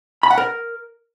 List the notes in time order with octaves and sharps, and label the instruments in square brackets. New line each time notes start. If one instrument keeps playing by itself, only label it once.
[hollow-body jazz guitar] B5
F#5
A#4